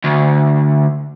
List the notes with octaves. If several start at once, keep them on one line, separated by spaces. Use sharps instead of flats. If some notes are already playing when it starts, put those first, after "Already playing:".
D2